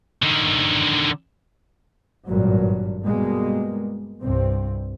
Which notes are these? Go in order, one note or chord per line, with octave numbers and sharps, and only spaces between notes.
D3 D#3
G#1 G2 A#2 F#3
B2 G3 G#3 A#3
C2 G2 C4